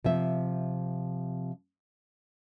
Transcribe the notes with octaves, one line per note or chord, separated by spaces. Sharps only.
C3 F3 E5